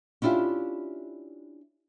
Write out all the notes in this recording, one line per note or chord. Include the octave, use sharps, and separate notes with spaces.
C#4 D4 E4 F4 G4